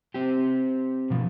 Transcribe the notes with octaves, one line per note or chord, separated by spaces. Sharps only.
C4 G4
B2 F3